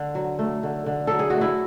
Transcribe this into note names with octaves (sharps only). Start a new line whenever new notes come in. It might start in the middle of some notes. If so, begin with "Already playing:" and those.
Already playing: D3
F#3
A3
D3
D3
F#3 A4
G#4
A3 F#4
E4